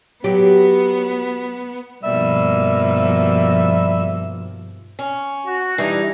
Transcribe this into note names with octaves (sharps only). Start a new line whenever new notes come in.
F#3 B3 G4
G2 B2 F3 G3 A#3 D#4 E5
C#4
F#4
E3 G3 D4 D#4